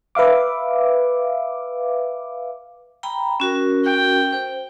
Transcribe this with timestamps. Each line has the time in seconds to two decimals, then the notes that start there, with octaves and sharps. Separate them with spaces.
0.15 B4 E5 F5 D6
3.03 G5 A#5 B5
3.40 C#4 F#4 A#4
3.85 G5
4.33 C5